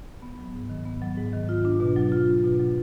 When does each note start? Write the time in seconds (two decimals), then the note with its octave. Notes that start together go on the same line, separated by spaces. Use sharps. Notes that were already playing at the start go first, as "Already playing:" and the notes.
0.22 B3
0.38 F#3
0.54 G#2
0.70 D#3
0.85 B3
1.01 F#3
1.17 G#2
1.33 D#3
1.49 F4
1.65 D4
1.80 B2
1.96 F#3
2.12 F4
2.28 D4
2.44 B2
2.60 F#3